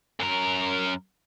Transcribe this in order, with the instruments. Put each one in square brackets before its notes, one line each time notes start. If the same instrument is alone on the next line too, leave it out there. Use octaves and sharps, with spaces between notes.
[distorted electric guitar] F#2 A#4